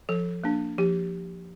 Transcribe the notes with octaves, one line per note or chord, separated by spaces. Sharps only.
F3 A4
A#3 D4
F3 G4